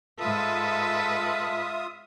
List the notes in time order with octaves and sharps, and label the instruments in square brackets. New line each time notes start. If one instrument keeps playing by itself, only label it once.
[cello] G#2 B4 [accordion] F4 E5 D#6 [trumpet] A4